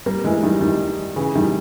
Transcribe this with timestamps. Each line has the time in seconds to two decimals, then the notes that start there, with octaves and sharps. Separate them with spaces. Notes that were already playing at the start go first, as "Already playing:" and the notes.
0.06 G3 A#3
0.24 E3 G#3
0.43 D#3 G3
0.61 D#3 G3
1.16 C#3 E3
1.35 D#3 G3